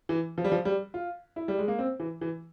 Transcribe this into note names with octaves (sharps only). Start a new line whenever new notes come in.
E3
F3
G3
F3
G3
F4
E4
G3
G#3
A#3
C4
E3
E3